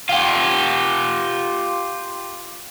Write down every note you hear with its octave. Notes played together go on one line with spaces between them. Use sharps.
F4 G4